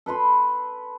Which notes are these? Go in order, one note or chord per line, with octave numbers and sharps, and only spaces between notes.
A4 B4 B5 C6